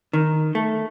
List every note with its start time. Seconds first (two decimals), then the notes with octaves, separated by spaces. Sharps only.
0.13 D#3
0.55 A3